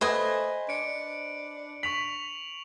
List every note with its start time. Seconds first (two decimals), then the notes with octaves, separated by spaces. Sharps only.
0.01 A3 B4 C5 D#5 G#5
0.69 D4 C#7 D7
1.83 C#6 B6 F7 F#7